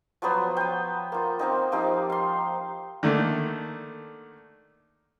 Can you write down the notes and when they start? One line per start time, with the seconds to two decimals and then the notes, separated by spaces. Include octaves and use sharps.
0.22 F3 F#3 B3 C5
0.57 G5 D#6
1.12 A#3 F4
1.39 A#3 C4 D#4
1.72 F3 D#4 G4 F5
2.10 F5 C6
3.03 D3 D#3 A3 A#3